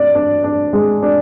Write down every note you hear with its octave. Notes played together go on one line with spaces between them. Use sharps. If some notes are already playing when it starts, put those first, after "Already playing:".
Already playing: D4 D5
D4
D4
G#3
D4